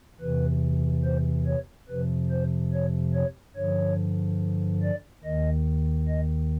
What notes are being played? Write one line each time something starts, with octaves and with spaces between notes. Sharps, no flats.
E2 C3 E3 B4
C5
C#5
F2 C3 F3 B4
C5
C#5
C#5
G2 D3 F3 C#5
D5
D#2 D#3 D#5
D#5